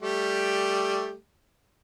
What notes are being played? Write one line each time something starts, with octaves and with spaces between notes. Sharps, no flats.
G3 A3 G4